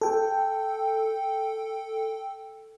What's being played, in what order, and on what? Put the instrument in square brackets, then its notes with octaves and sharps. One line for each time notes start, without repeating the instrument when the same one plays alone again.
[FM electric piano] A4 G5